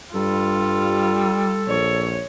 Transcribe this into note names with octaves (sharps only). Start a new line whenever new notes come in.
G2 G3 F4 A4
A#1 C#5